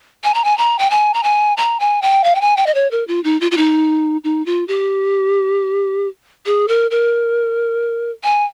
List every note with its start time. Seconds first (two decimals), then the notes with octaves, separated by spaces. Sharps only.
0.24 G#5
0.34 A#5
0.44 G#5
0.58 A#5
0.79 G5
0.91 G#5
1.14 A#5
1.23 G#5
1.57 A#5
1.80 G#5
2.02 G5
2.24 F5
2.35 G5
2.41 G#5
2.57 G5
2.67 D#5
2.75 C#5
2.91 A#4
3.08 F4
3.24 D#4
3.41 F4
3.51 F4
3.57 D#4
4.24 D#4
4.46 F4
4.68 G4
6.46 G#4
6.68 A#4
6.91 A#4
8.24 G#5